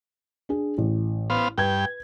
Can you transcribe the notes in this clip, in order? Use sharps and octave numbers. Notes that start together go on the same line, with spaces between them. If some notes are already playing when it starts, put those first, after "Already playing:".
D4 G#4
A1
B3 C5 F5
G2 B4 G5 G#6